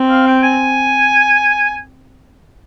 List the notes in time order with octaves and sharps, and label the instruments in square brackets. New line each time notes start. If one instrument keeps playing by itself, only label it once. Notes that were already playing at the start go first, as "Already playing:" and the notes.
Already playing: [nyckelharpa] C4
[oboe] F5
G5
G#5